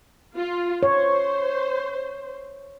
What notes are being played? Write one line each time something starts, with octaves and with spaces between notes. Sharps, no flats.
F4
C5 C#5